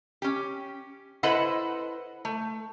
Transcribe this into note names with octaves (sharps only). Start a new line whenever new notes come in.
C#4 G4
E4 A4 B4 C5 D#5 F#5
A3